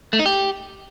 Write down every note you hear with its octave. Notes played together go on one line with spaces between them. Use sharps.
A3
D#4
G4